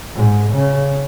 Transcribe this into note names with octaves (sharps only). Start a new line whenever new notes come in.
G#2
C#3